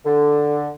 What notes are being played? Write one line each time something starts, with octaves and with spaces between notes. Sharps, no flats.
D3